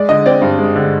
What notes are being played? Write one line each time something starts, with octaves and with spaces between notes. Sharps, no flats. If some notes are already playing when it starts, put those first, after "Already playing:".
Already playing: G#3 D5
D3 D#5
C4 D5
G2
G#3
D3